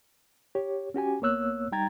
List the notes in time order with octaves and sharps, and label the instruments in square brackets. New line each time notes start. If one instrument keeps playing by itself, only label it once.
[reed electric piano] G4 C#5
C#4 F#4 G4 G#5
C2 A#3 B3 C#5 E6 F#6
G3 D#4 G5 A#5 G#6 A6